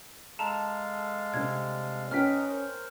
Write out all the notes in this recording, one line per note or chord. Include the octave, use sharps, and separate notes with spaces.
G#3 A4 F5 A5 A#5
C3 G3 D4 G#6
C#4 D#4 B4 D#5 G5 F6 B6
A#4 C5